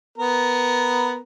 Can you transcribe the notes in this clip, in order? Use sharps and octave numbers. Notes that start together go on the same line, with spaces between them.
B3 A#4